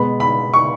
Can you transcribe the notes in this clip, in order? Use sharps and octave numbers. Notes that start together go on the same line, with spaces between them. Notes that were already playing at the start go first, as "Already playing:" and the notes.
Already playing: B2 G#3 B3 B5
B5
C#6